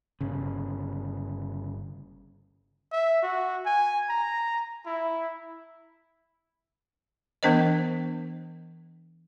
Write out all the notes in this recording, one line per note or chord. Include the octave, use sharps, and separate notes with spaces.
G1 C#3
E5
F#4
G#5
A#5
E4
E3 B3 D4 A#4 C5 D#5